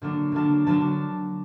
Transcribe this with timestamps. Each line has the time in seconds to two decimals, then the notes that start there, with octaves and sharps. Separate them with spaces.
0.02 D3 F#3 A#3 D4
0.32 D3 F#3 A#3 D4 A5
0.66 D3 F#3 A#3 D4 A5